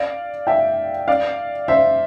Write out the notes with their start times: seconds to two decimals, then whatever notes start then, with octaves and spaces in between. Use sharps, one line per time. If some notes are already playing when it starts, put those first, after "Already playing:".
Already playing: D5 F5
0.47 E5 G5
1.08 D5 F5
1.68 C5 E5